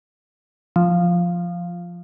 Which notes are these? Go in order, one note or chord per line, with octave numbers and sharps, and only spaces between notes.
F3